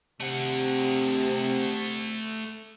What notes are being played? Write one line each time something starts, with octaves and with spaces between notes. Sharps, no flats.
C3 A3 F#5